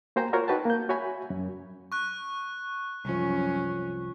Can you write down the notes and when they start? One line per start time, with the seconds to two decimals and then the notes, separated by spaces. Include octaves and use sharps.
0.16 A#3 F#4 C5 G5 G#5 A#5
0.33 F4 F#4 A#4 C5 C#5
0.48 D#4 F#4 B4 G5 A5
0.65 A#3 G6
0.89 F#4 C#5 E5 G#5 B5
1.30 F#2
1.92 C#6 F#6
3.05 C2 F#2 F3 C#4